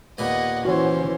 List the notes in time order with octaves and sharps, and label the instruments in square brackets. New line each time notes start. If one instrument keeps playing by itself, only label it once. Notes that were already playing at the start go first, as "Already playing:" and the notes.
[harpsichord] D#2 A#2 B3 [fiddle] D#5 F#5
[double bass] E3 [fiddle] C#4 C5 [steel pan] F#4 C#5